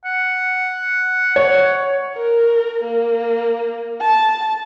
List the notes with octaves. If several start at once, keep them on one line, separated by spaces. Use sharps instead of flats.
F#5
C#5
A#4
A#3
A5